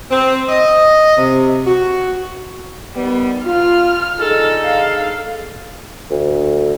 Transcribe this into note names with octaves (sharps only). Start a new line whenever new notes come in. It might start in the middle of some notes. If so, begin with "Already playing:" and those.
C4
D#5
C3
F#4
D#3 G3 B3
F4 F6
D3 D#4 G#4 A4
F5
D2